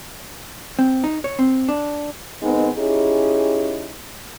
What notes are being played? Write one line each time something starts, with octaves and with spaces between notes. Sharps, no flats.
C4
D#4
C#5
C4
D4
D#3 G#3 B3 C4 D#4
C#4 D#4 E4 G4 G#4